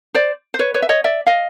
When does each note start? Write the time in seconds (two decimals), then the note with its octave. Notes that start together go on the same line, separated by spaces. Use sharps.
0.15 C5 D5
0.54 C5
0.59 B4 C#5
0.74 B4 C#5
0.82 E5
0.89 C#5 D#5
1.04 D5 E5
1.27 D#5 F5